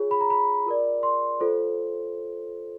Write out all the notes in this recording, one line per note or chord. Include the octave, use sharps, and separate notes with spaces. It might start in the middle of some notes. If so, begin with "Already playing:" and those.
Already playing: F4 G#4 C#5
B5
A#5
B5
F4 A#4 D5
C6
F4 A4 C5